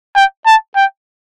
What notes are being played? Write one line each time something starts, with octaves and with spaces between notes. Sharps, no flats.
G5
A5
G5